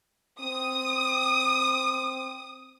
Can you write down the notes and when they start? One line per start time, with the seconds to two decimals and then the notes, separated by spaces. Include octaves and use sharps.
0.40 C4 D#6